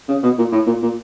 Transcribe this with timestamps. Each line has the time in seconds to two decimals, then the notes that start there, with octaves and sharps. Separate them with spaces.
0.08 C#3
0.23 B2
0.38 A#2
0.52 A2
0.66 A#2
0.82 A#2